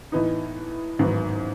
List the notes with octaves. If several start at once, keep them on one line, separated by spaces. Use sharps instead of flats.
A2 E3 B3 D#4
A1 G#2 D#3 F#3 B3